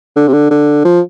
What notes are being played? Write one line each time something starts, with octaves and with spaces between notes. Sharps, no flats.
D3
C3
D3
D3
F3